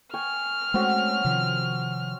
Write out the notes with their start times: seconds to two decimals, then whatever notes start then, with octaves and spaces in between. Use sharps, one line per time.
0.14 G5 G#5 C#6 F6
0.74 G#3 A3 C4 C#4 F#4
1.25 C3 D#3 F3